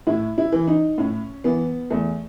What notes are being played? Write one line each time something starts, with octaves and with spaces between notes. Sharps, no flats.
A2 E4
E4
E3
D#4
A2 C#4
E3 B3
E2 A3